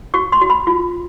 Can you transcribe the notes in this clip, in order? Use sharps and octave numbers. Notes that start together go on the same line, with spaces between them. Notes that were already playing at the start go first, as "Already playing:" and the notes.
F#4 C#6
C6
F#4
B5
F4